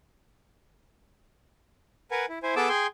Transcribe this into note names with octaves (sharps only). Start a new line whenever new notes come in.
A#4 B4 F#5 G#5
E4
E4 C5 G#5
B3 G#4 A4 A5 D6 E6
G#4 G5 G#5 C6